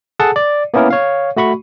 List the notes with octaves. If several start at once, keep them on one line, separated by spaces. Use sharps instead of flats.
G#4 A4 F#5 A5
D5
A#3 B3 C#4 E4 A#4
C#5 F5
A3 F#4 B5 C#6